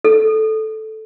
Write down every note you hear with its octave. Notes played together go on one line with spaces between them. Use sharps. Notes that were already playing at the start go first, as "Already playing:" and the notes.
A4